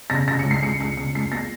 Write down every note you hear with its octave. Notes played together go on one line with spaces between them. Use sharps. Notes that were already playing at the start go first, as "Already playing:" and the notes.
C#3 A#6
C#3 A#6
C#7
C#2
C7
C#2 C#7
C#2 C#7
C#3 C#7
C#2 C7
A#3 A#6